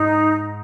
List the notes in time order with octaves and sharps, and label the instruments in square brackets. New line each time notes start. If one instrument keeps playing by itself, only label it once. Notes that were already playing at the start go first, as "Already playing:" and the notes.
Already playing: [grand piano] G#2 [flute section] D#4